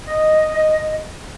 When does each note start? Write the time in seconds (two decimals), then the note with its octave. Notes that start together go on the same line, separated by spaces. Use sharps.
0.07 D#5